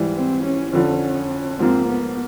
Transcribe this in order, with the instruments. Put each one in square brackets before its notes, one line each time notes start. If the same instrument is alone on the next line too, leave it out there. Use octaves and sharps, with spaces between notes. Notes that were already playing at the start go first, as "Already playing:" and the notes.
Already playing: [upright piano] G#2 E3 G3
[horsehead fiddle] C4
C#4
[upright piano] F2 D3 F3 [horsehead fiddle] C#4
[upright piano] G#2 F3 A#3 [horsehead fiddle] C4
[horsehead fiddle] B3